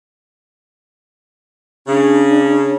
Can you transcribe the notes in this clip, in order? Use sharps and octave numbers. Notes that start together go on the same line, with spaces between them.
C#3 D4